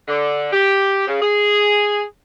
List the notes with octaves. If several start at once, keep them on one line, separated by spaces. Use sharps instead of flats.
D3
G4
C#3
G#4